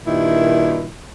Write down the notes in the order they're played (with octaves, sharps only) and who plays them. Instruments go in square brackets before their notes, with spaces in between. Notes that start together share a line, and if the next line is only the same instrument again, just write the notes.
[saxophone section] G2 A#2 D#3 E4